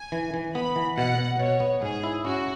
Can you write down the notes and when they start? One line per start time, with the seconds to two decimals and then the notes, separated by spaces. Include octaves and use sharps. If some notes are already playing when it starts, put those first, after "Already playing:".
Already playing: G#5
0.12 E3
0.34 E3
0.55 B3 B5
0.76 E3
0.97 B2 F#5
1.18 B2
1.39 B2 C#5
1.60 B3
1.82 G#2 G#4
2.04 E4
2.25 C#4 F#4